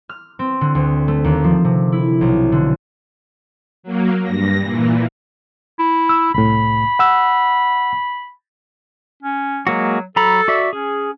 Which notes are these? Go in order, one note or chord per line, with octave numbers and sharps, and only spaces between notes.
F6
C4
D3
D2
A3
D#2
F3
C3
E4
B1
D3
F#3 A#3
G2 A#6
A#2 E3
E4
E6
C2 A2 B5
F#5 E6
C#4
F#3 G#3 A#3 F#4
F#3 A4 A#5 B5
F#4 D5 E5
C#4 G#4